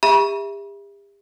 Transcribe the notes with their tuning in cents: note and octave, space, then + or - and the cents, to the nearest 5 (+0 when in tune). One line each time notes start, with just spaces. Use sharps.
G4 +45 E5 +0 B5 -40